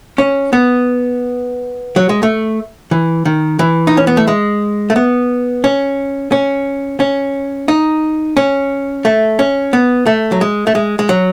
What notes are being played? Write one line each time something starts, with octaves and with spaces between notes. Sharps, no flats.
C#4
B3
F#3
G#3
A3
E3
D#3
E3
D#4
C#4
B3
A3
G#3
A3
B3
C#4
C#4
C#4
D#4
C#4
A3
C#4
B3
A3
F#3
G#3
A3
G#3
G#3
F#3